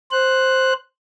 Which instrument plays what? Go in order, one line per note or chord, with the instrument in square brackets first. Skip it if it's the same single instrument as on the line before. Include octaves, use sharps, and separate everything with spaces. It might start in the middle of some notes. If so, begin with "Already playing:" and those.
[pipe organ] C5 F#6